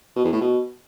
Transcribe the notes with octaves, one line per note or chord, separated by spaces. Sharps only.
B2
E2
A2
B2